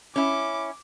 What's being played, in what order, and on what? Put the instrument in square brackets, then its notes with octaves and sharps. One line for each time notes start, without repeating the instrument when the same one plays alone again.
[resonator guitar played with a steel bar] C#4 E4 [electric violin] D6